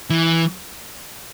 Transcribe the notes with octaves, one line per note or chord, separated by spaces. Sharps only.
E3